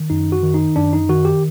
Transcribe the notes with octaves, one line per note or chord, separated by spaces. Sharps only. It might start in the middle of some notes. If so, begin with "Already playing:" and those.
Already playing: D#3
F#2 D#4
F#4
D#3
D#4
F#2 D4
D#4
D#3 F#4
G4